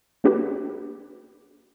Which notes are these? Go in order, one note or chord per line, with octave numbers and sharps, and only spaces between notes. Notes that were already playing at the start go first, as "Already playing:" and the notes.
A#3 D4 F#4 G4 B4